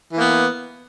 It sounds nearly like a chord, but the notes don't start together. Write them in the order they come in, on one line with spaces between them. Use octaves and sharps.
E3 A#3 B3